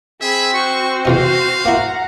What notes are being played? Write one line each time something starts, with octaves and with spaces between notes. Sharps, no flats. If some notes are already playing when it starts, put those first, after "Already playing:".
C4 G#4 E5 B5
F#4 C5 C#6
E2 B2 D#4 F5
A#3 E4 F#5 A#5